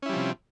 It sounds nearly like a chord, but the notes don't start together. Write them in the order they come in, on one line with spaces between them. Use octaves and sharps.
C#4 E4 G3 F3 C3